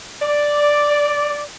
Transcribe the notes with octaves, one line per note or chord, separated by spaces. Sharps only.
D5